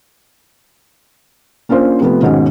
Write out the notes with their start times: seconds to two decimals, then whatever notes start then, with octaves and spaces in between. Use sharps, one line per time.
1.69 A#3 C#4 D4 F4 C5
2.00 C3 F3 A3 B3
2.23 D#2 G#2 B2 C#4